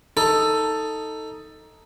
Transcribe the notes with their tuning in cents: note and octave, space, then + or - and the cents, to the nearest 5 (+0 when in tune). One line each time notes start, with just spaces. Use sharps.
D#4 +10 A4 +10